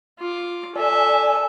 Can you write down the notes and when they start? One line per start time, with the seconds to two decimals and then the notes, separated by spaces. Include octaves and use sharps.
0.19 F4 D6
0.76 A4 D5 E5 G#5